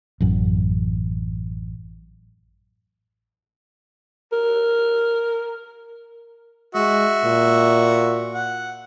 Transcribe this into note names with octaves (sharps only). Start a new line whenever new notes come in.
A1 F#2
A#4
G#3 F#4 E5
A#2
F#5